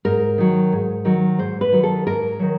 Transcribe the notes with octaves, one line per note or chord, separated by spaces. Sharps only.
G#2 A#4
D#3 F#3
G#2
D#3 F#3
G#2 C5
B4
D#3 F#3
A4
G#2 A#4
D#3 F#3